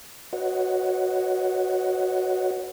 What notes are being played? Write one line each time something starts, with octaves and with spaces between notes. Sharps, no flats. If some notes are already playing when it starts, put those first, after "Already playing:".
F#4 B4 C#5 D#5 F#5